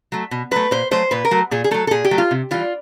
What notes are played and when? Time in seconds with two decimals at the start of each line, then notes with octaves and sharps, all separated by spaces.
0.12 F#3 A3
0.31 B2
0.51 F#3 A3 B4
0.71 A#2 C5
0.91 F#3 A3 C5
1.11 A#2 B4
1.25 A#4
1.31 F#3 A3
1.51 A#2 G#4
1.64 G#4
1.71 F#3 A3 A4
1.87 A4
1.91 A#2 G#4
2.05 G4
2.11 F#3 A3
2.18 F4
2.31 C3
2.51 E3 G3 F4